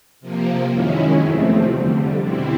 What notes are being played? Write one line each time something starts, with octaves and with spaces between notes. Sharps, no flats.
C3 F3 A#3
F#2 D#3 G#3 C#4 E4
E2 C3 F3 A3 C4
F2 D3 G3
B2 G3 C4 E4